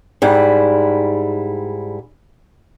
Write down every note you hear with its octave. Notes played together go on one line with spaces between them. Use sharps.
G#2 G3 E4